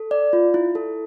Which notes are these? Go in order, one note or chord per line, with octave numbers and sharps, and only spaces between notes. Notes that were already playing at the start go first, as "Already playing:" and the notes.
Already playing: A4
D5
F4
E4
A4